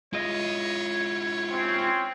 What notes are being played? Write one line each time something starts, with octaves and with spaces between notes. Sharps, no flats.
G#3 E4 F4 C#5 D#5
C4 C#4